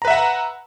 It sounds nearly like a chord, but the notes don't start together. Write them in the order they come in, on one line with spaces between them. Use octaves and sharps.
A#5 B4 E5 F#5